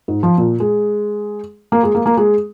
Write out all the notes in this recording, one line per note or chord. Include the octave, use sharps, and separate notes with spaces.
G#2
F3
A#2
G#3
A#3
G#3
A#3
A#3
G#3